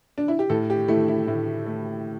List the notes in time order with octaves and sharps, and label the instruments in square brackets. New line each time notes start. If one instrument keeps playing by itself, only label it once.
[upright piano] D4
E4
G4
A2 A4
G4
A3 E4
E4
A2 E4
A3